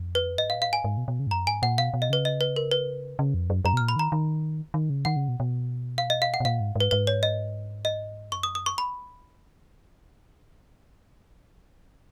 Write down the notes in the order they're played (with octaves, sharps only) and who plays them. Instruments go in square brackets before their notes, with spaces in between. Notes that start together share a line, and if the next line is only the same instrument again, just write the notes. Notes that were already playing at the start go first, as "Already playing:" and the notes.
Already playing: [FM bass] F2
[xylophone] B4
[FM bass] G#2 [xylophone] D#5
[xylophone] F5
[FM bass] A#2
[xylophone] F5
[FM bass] G#2 [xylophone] G#5
[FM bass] G#2
B2
B2
C#3
G#2
[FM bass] F#2 [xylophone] A#5
[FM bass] G#2 [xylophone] G#5
[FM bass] A#2 [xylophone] F#5
[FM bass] B2 [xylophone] F5
[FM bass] B2
[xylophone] D#5
[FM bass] C#3 [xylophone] B4
[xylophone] D#5
B4
A#4
B4
[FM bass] C#3
F2
F#2
[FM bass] F#2 [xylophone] A#5
[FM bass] B2
[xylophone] F6
[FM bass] A#2
[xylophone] B5
[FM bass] D#3 [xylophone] A#5
[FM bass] D#3
D#3
C#3
[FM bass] D#3 [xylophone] F#5
[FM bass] C#3
B2
B2
[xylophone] F5
D#5
F5
F#5
[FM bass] B2
[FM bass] A#2 [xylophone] F5
[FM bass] G#2
[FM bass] G#2 [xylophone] B4
[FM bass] G#2 [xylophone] B4
[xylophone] C#5
D#5
D#5
[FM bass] F#2 [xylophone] C#6
[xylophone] D#6
D#6
C#6
B5